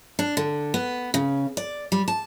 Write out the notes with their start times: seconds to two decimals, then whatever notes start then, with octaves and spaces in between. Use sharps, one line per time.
0.19 D4
0.37 D3
0.74 B3
1.14 C#3
1.57 D5
1.92 G3
2.08 A5